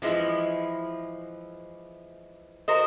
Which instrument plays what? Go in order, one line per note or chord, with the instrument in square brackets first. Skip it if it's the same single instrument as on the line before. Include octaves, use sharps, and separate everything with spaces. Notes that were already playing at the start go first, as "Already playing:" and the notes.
[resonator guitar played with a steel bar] E3 F3 G#3 E4
F#4 A#4 C5 D#5